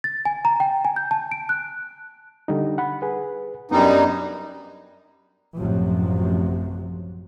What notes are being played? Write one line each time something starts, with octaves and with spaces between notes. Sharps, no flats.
A6
G#5
A#5
G5
G#5
G6
A5
D7
F#6
D3 G3 D#4
F#5 B5
G#4 B4
F#2 G3 B3 D4 D#4
A1 F#2 C3 F3 F#3